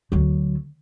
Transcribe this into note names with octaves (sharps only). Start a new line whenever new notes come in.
D2 F#3